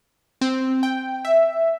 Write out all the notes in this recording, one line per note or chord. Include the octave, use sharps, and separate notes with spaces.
C4
G5
E5